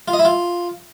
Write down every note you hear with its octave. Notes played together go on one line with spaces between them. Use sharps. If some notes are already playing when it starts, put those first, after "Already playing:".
F4
D#5
E4
F4